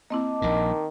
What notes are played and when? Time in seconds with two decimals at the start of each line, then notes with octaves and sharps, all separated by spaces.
0.10 A#3 C4 E4 D#5 A5 D6
0.42 A#1 A#2 D#3